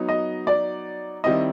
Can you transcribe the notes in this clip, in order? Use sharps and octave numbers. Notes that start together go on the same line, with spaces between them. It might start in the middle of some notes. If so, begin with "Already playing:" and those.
Already playing: F#3 B3 D#4
D#5
D5
D#3 G3 C4 E4 D#5